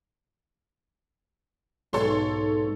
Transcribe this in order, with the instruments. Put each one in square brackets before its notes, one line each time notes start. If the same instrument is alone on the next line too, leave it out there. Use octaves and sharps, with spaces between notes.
[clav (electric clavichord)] B1 G#5 [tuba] G#2 [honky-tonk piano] A4 C#5 C6